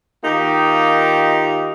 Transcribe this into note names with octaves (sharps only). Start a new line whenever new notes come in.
D#3 A#3 D#4 F4 G4